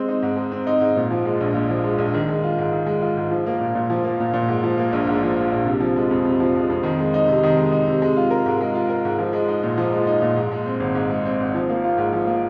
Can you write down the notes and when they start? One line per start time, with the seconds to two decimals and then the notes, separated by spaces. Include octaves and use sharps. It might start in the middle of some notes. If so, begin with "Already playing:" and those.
Already playing: G#3 C4
0.08 D#4
0.23 G#2
0.37 G#3
0.52 C4
0.67 D#4
0.81 G#2
0.96 A#2
1.11 F3
1.25 G#3
1.41 A#1
1.54 A#2
1.70 F3
1.84 G#3
1.98 A#1
2.14 D#3
2.29 G#3
2.44 F4
2.58 G#2
2.72 D#3
2.87 G#3
3.02 F4
3.17 G#2
3.31 F3
3.46 A#3
3.61 A#2
3.75 A#2
3.90 F3
4.04 A#3
4.20 A#2
4.33 A#2
4.48 G#2
4.63 F3
4.78 A#3
4.93 A#1
5.07 G#2
5.23 F3
5.36 A#3
5.52 A#1
5.66 C3
5.80 F3
5.96 G#3
6.11 F2
6.25 C3
6.40 F3
6.55 G#3
6.70 F2
6.83 D#3
6.99 G#3
7.14 D#4
7.28 C3
7.43 D#3
7.57 G#3
7.72 D#4
7.87 C3
8.02 G#3
8.17 F4
8.30 A#4
8.46 G#2
8.61 G#3
8.75 F4
8.89 A#4
9.05 G#2
9.19 F3
9.33 G#3
9.48 D#4
9.63 A#2
9.78 F3
9.92 G#3
10.07 D#4
10.22 A#2
10.37 G#2
10.52 G#3
10.66 C4
10.80 G#1
10.95 G#2
11.10 G#3
11.25 C4
11.40 G#1
11.54 F3
11.69 A#3
11.84 F4
11.98 G#2
12.13 F3
12.27 A#3